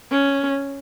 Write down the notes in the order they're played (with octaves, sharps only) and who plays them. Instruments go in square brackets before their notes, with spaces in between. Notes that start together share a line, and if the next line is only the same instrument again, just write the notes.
[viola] C#4